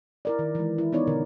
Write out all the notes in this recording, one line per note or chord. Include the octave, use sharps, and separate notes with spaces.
E4 A#4 D5
D#3
E3 G#3
E4
B3 D#4 C#5 D5
B2 D3 A#4